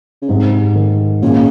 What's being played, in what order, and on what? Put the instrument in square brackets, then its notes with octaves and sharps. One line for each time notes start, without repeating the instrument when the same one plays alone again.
[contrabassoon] C#3
[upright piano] G#2 [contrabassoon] C3
[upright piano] D#3
[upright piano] A#2 [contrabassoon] C#3